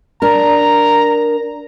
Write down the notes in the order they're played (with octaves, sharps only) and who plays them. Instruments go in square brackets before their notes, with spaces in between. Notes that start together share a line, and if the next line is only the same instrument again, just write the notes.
[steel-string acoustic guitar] D4 A#4 [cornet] A#5